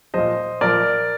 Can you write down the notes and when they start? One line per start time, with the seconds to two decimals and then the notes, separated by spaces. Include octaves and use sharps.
0.14 A#2 F3 C5 D#5
0.61 A#2 F3 A#4 D5